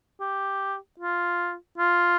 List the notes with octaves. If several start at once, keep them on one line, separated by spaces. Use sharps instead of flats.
G4
F4
F4